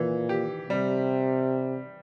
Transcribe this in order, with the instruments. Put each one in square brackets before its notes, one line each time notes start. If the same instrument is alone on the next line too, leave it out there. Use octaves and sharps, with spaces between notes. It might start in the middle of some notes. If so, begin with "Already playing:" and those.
Already playing: [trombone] A#2 [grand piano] E3
[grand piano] G4
[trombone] C3 [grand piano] G3